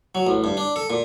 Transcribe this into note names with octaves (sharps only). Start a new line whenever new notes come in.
F#3
A1
G2
D4
A4
A#2